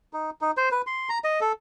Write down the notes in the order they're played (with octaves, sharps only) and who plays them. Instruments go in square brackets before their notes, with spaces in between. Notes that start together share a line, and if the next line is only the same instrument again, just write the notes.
[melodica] D#4
D#4
C5
B4
C6
A#5
D#5
A4